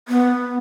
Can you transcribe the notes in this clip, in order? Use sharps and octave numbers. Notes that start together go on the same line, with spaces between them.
B3